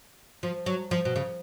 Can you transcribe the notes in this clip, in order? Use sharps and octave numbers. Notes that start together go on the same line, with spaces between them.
F3
F#3
F3
B2
C#3